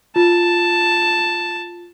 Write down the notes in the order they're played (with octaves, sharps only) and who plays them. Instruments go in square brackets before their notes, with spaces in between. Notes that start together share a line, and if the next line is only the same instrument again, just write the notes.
[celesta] F4 [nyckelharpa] A5